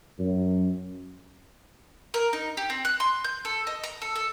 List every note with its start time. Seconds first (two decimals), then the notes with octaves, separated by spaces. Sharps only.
0.19 F#2
2.14 A#4
2.33 D#4
2.57 G4
2.70 C4
2.85 F#6
3.00 C6
3.24 G6
3.45 A4
3.67 D#5
3.84 A#5
4.02 A4
4.16 A4